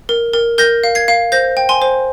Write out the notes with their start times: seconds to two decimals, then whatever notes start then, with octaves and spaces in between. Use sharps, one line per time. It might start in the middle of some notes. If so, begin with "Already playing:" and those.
0.09 A#4
0.33 A#4
0.58 A#4 G6 A#6
0.84 F5
0.95 G#6 C7
1.08 F5
1.32 C5 G6 A#6
1.57 G5
1.69 G#5 C6
1.82 C5